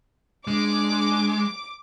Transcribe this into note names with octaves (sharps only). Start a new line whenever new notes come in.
G#3 D4 D6